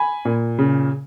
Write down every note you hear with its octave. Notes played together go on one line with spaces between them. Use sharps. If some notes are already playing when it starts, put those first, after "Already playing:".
Already playing: G#5 B5
A#2
C#3